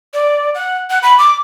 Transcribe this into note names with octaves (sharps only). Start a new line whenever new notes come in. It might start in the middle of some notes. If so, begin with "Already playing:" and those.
D5
F#5
F#5
B5
D6